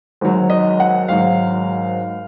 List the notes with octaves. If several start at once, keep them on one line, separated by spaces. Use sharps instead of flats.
G#1 G#2 F#3
D#5
F#5
G#1 G#2 F#3 F5